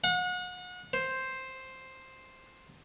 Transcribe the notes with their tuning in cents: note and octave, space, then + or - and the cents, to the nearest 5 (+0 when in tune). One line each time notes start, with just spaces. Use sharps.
F#5 -35
C5 +5